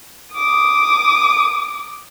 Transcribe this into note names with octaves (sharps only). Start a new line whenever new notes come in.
D6 D#6